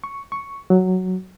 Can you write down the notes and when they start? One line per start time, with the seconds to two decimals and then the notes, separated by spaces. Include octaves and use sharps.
0.04 C#6
0.32 C#6
0.70 F#3